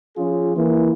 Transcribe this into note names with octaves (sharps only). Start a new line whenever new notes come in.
F3 C#4 F4 G#4
E3 A#3